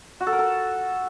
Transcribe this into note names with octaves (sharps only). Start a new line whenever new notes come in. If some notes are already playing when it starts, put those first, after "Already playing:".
F#4
A4
A#4
A4